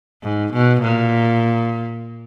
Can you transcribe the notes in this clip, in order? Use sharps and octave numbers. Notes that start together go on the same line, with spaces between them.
G#2
B2
A#2